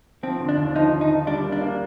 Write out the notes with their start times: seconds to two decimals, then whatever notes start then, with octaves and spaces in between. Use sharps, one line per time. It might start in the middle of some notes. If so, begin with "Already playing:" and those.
0.23 F3 C4
0.40 D3
0.49 D4
0.57 D#2
0.76 F3 D#4
0.92 D3
1.01 D#4
1.09 F3
1.27 G3 D4
1.44 A#3
1.52 D4
1.61 A#3